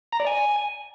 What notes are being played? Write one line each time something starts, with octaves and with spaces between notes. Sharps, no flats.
A#5
D5
G#5